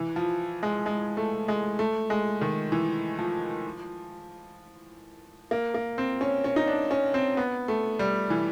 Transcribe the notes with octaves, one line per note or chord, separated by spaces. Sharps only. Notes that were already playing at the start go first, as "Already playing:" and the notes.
Already playing: E3
F3
G#3
G#3
A3
G#3
A3
G#3
D#3
E3
F3
A#3
A#3
C4
C#4
C#4
D#4
D4
C#4
C4
B3
A3
G3
E3